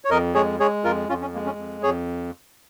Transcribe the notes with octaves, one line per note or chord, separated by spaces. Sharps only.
C#5
F2 A#4 D#5
G#3 G#4 C#5
G#3 G#4 C#5
F2 F4 A#4
F2 C#4 F4
C#4
G#3 A#3
C#4
F2
F2 G#4 C#5